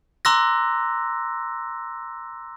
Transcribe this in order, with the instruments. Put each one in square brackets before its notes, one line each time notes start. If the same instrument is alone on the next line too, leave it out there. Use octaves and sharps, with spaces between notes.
[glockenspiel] A#5 C6 D6 E6 F#6 A#6